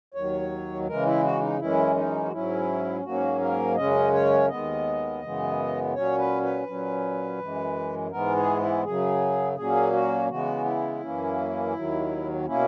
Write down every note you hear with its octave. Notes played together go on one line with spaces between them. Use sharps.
D#2 D#3 F#3 C#5
C#3 E3 G#3 A#4
E4
F#4
D#4
F#2 E3 G#3 C#4 E4
D#4
F#4
G#2 F#3 C#4 E4
G#2 F#3 A#3 C#4 F#4
A#4
F#2 C#3 G#3 C#4 D#5
C#5
D#2 D#3 G#3 B3 D#5
F#2 C#3 E3 G#3 B3
A#2 F#3 C#4 C#5
B4
B4
A#2 F#3 C#4
F#2 E3 G#3
G#2 E3 G#3 B3 A#4
G#4
E4
F#2 C#3 F#3 G#4
A#2 F#3 A#3 C#4 G#4
F#4
C#3 E3 G#3 B3 F#4
E4
F#2 E3 A#3 C#4
D#2 D#3 F#3
B2 A#3 C#4 E4